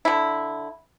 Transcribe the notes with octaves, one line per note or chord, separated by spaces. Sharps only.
D3 E4